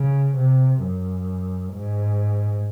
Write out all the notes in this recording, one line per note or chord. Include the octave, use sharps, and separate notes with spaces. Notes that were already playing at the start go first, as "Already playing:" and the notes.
Already playing: C#3
C3
F#2
G#2